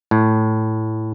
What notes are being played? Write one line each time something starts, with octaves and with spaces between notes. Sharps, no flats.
A2